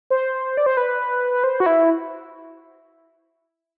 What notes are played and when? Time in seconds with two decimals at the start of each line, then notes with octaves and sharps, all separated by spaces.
0.10 C5
0.57 D5
0.66 C5
0.77 B4
1.44 C5
1.60 F#4
1.66 E4